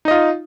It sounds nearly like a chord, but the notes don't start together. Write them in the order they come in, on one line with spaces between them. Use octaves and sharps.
D#4 D#5 F4